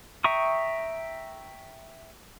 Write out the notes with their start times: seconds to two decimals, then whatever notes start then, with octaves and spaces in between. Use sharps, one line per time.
0.24 E5 G5 A#5 C#6 D#6